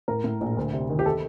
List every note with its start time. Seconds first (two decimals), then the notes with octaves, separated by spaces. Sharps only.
0.08 A2 A#4
0.24 A2
0.41 A#1
0.57 D2
0.73 C3
0.90 D#3
0.99 G4
1.06 A4